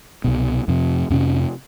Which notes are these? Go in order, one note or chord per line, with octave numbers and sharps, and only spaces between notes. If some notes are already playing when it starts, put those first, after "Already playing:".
C2 B2
F2 C3
F2 C3 C#4